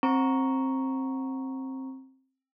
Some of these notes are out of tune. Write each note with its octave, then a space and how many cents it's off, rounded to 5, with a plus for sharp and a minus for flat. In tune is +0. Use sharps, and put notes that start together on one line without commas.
C4 +20 A#5 +0 C#6 +0